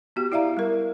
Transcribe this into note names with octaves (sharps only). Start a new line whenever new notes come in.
B3 F#4 G4
E4 D5 E5 F5 A#5
G3 A#4